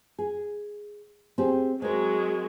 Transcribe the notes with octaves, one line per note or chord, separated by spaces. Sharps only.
G#4
C4 G4 G#4
F#3 G#3 C4 A#4